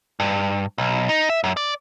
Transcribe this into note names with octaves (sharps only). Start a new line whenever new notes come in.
G2
B1
D#4
E5
F#2
D5